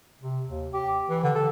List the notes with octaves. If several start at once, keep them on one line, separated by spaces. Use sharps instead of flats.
C3
D#2
G4
E3
D3
A4